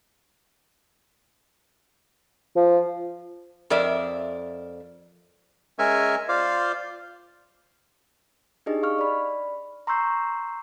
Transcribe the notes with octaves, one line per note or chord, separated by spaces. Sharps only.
F3
F2 A#4 D5 E5
G#3 C#4 A#4 E5 G#5 C#6
F4 C5 D5 F5
D4 D#4 G4 G#4 D#5
F5 C#6 F6
D5 B5
A#5 C6 C#6 E6 G6 C7